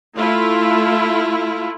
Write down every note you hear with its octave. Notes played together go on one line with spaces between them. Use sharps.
A3 E4 F4